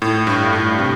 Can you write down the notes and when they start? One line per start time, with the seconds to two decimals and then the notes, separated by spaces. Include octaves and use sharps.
0.02 A2
0.27 G2
0.53 A2
0.79 C3